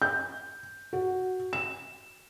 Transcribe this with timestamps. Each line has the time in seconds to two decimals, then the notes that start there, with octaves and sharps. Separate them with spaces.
0.02 G6
0.93 F#4
1.53 E7